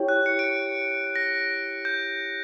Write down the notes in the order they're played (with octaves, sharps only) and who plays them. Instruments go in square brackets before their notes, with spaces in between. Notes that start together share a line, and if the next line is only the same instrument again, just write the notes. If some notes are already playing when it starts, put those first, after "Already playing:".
Already playing: [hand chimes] E4 G4 C#5 G5
[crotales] F#6
C#7
D7
C#7
A#6
G6